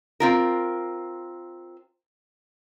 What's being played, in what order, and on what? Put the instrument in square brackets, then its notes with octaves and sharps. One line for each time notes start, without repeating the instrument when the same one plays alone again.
[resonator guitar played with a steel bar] C4 F4 A#4